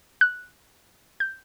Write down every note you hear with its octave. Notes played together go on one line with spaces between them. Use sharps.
F#6
G6